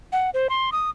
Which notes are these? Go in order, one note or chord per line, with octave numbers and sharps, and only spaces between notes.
F#5
C5
C6
D#6